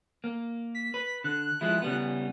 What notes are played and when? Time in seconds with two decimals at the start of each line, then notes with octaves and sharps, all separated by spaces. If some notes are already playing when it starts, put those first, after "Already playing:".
0.24 A#3
0.75 B6
0.94 B4
1.24 D3 F#6
1.61 F3 G#3 E4
1.82 C#3 G3 B3